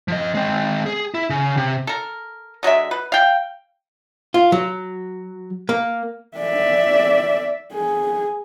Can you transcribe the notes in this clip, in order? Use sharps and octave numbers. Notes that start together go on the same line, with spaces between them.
F3 D#5
G#3 C4
G#4
E4
C#3
C3
A4 A#4
D3 F#3 G#3 E5
B4
F5 G5
F4
F#3
A#3
D5 E5
G#4